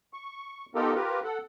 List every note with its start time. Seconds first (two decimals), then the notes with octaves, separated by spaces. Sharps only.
0.13 C#6
0.75 B3 D#4 F4 G4 A4 A#4
0.95 F4 G4 A#4 B4
1.24 A4 F#5